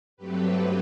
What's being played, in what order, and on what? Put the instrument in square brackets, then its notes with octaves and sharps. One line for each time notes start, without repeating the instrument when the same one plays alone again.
[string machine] G2 F#3 A3 C4 G4 B4